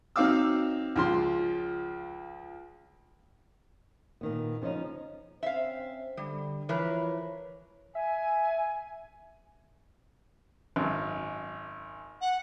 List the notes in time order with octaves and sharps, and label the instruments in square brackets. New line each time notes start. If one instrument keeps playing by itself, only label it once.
[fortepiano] F#3 C4 D#4 F5 D6 E6
C#2 F3 C6
[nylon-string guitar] A#2 D#3 B3
C#3 F3 C#4 D#4
[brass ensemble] C4 C#4 C5 [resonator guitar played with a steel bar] E5 F5
[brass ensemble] D3 [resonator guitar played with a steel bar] G3
[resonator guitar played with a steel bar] E3 A#4 B4 [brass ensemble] F3 C#5
[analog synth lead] E5 [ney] G#5
[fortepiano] G#1 F#2
[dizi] F#5